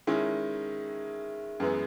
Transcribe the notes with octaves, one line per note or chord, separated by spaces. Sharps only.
D#3 G#3 C#4 E4
F#2 E3 G#3 B3